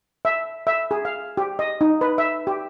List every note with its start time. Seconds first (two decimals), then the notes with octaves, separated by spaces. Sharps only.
0.25 E5
0.67 E5
0.91 G#4
1.05 F5
1.37 G4
1.59 D#5
1.81 D#4
2.01 B4
2.18 E5
2.47 G4